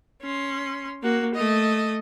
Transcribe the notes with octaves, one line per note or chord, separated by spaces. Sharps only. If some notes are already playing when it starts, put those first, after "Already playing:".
C#4 C6
A#3 F#4
A3 D#5